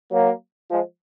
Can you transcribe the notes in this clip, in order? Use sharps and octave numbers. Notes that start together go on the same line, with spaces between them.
F#3 A#3
F3 G#3